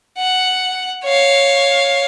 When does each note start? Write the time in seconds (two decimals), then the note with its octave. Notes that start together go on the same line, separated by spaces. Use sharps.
0.18 F#5
1.05 C#5 F5